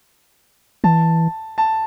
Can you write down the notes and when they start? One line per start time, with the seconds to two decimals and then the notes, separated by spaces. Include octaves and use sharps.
0.84 E3 A5
1.58 A5